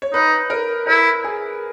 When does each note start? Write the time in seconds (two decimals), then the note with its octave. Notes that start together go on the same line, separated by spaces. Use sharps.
0.02 C#5
0.13 D#4 B4
0.50 A#4
0.87 E4 A#4
1.24 G#4